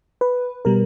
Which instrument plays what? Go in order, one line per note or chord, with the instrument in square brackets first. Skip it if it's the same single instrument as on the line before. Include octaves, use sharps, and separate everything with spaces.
[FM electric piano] B4
B2 G3 A#4